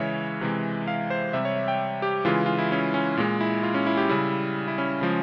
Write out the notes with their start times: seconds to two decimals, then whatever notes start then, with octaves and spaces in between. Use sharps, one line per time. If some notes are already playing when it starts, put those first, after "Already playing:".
Already playing: C#3 E3 G#3 C#5 E5
0.41 C3 E3 G#3
0.87 F5
1.10 C5
1.33 C3 G3 E5
1.45 C#5
1.56 E5
1.68 G5
2.02 G4
2.25 C#3 E3 G#3 F4
2.46 F4
2.58 E4
2.72 C#4
2.94 C#4
3.17 A#2 G#3
3.41 E4
3.63 F4
3.74 C#4
3.86 E4
3.97 G4
4.09 C#3 G3 E4
4.68 E4
4.78 C#4
5.01 C#3 F3 G#3